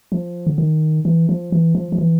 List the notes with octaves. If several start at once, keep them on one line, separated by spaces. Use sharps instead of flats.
F3
D3
D#3
E3
F3
E3
F3
F3
E3